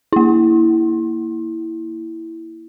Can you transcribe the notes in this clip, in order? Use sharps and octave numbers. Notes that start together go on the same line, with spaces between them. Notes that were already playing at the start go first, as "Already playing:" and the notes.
A#3 E4